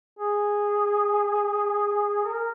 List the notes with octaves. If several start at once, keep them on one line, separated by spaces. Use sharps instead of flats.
G#4
A#4